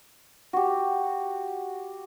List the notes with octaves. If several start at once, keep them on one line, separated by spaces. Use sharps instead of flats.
F#4 G4